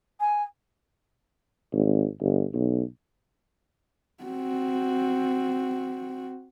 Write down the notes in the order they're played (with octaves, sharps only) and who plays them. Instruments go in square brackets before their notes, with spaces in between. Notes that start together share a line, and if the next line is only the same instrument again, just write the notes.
[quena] G#5
[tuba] G#1
G1
B1
[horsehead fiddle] C4 F#4